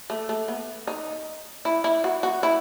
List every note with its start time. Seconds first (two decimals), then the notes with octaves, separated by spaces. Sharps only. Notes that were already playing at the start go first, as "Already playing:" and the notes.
0.10 A3
0.29 A3
0.48 B3
0.87 D#4
1.65 E4
1.84 E4
2.04 F#4
2.23 F#4
2.43 E4